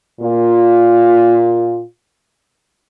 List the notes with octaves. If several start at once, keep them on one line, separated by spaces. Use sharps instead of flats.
A#2 F4